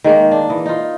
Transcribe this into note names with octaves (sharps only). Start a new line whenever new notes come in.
D#3 G#3 A#3
D4
E3 D#5
D#4 F4